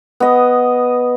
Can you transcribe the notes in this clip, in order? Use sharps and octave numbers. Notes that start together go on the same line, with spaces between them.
B3 D#5